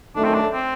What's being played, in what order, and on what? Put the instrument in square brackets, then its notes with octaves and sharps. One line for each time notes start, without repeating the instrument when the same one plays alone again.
[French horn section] F#2 D#3 A3 [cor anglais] D4
[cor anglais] C4
D4
C4